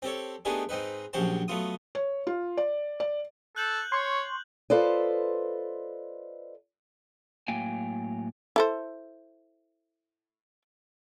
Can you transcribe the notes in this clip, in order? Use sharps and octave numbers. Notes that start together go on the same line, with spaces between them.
C4 G4 A4 C#5
A3 B3 D4 D#4 G4 G#4
G#2 C4 D#4 B4
A#1 C#3 F#3 G4 C5 A5
F#3 A3 B3 F4 D#6
C#5
F4
D5
D5
A4 F#6 G6 F#7
C#5 C6 C#6
F4 A4 B4 C5 D5 D#5
A2 F#3 A#3 G5 G#5
E4 A4 C5